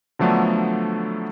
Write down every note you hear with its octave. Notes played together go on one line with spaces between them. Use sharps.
D3 F3 F#3 A3 B3 D4